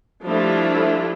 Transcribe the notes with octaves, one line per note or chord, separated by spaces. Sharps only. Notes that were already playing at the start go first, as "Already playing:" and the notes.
F3 G3 A3 D4 E4 F4